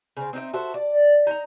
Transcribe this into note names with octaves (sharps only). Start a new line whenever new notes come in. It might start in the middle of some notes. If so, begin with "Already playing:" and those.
C#3 C4
C4 D#4 G#4 E5
F#4 A4 C5 E5
D5
D#4 A#5